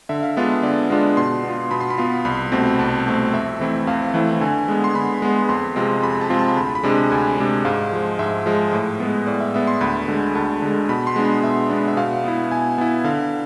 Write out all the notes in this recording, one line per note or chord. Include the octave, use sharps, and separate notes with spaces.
D3 E5
F5
G#3 B3 D4 F4 E5
D3 D5
G#3 B3 D4 F4
B2 C6
B3 F4
B2 B5
C6
B5
B3 F4
C2 B5
B2 A3 C4
C2 A5
B2 A3 C4
F2 E5
E3 A3 C4 E4
F2 F5
E3 A3 C4 E4
D3 G#5
G#3 B3
C6
D3 B5
G#3 B3
F2 C6
C3 G#3 C4 F4
F2 B5
A5
C3 G#3 C4 F4
A5
D2 B5
B5
C3 G#3 D4
D2 G#5
C3 G#3 D4
G#2 F5
F3 G#3
G#2 E5
F3 G#3
A2
G#3 B3
A2 D5
E5
G#3 B3 E5
C6
D2 B5
D3 G#3
D2 A5
D3 G#3
B2 B5
C6
G#3 B3 D4
B5
B2 E5
G#3 B3 D4
E5
B2 F5
B3 E4
B2 G#5
B3 E4
D3 F5